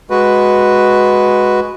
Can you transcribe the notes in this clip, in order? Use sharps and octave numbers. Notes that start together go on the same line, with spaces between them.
G#3 F#4 B4